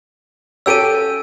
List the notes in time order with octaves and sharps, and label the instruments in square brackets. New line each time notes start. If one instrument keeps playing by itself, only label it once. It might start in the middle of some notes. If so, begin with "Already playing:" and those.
[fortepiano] C#4 G4 A4 [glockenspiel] E6 D7 D#7